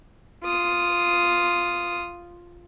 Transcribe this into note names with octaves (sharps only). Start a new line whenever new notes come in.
F4 D#6